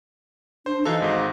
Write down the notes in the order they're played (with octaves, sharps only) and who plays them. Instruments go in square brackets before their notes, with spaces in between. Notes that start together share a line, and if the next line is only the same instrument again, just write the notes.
[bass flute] D4 [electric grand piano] C5
[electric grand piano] E3 D#4 A4 [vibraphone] F#4 C5 F5 [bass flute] D#5
[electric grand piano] G#1 G#2 D#4